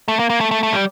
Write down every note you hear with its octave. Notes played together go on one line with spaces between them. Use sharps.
A3
A#3
A#3
A3
A3
A3
G3